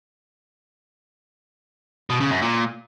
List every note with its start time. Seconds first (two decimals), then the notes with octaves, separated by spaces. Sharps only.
2.10 B2
2.20 C#3
2.31 F#2
2.42 A#2